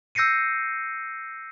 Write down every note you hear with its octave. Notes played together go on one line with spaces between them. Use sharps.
E6 G6 A#6 C7 C#7 D#7